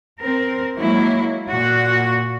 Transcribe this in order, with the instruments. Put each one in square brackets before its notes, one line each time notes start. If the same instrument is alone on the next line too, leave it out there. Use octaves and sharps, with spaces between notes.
[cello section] C4 A#4
F#3 G#3 A#3 E4
A#2 F#4